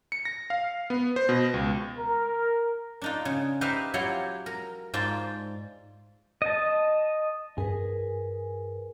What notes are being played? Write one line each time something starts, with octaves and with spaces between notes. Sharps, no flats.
C#7
A#6
F5
B3
C5
B2
C#2
A#4
D4 D#4 F4
C#3
D#4 G4 B4 C5 E5 F5
F#3 E4 F4 G4 C#5 F5
A#4
G#2 F4 C5 D5 A5
D#5 A5
G2 G#4 A#4 B4